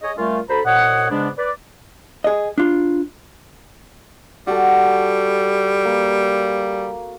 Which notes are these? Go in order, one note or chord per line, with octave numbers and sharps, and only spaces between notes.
G#4 C#5 D#5
A#2 G3 A3 C#4 F4
D2 A4 C5 A#5 B5
C2 A#2 C#5 D#5 F#5
G#2 C#3 G#3 B3 D4
B4 D5
G#4 D#5
D4 F4
G3 F#4 A4
A#3